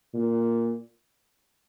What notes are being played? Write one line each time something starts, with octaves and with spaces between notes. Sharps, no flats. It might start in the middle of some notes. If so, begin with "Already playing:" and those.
A#2